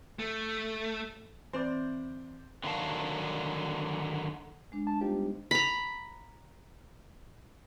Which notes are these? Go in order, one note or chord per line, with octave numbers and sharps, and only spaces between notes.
A3
E3 C4 C5 D5
D3 D#3 F#3 G4 F5 A5
G#3 D4
A5
G3 B3 D#4 F4 G4 C5
A#5 B5